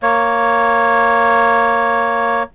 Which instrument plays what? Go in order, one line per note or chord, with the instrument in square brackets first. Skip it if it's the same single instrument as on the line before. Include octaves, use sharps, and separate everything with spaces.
[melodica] A#3 C#5